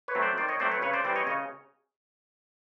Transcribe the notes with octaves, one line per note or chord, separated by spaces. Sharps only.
B4 C#5
F#3 A3 C4
C5 D5
D#3 C5 D5
C#5 D#5
F#3 A3 C4 C5 D5
B4 C#5
C#3 B4 C#5
C5 D5
E3 G3 C4 C5 D5
C#5 D#5
C#3 C#5 D#5